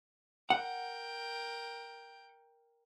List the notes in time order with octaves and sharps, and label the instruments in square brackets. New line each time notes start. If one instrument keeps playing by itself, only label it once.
[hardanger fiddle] A#4 G5 [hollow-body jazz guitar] F#5